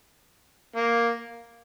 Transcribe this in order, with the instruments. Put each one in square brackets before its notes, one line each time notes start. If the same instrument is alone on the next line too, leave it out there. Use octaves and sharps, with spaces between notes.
[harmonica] A#3